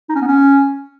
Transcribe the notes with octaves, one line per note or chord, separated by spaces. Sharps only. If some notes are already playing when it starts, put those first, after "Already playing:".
D#4
C#4
B3
C#4